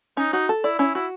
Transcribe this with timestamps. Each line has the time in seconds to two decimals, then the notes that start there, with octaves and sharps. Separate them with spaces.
0.17 C#4 D#4
0.33 D#4 F#4
0.49 A4
0.64 E4 D5
0.79 C#4 E4
0.94 E4 F#4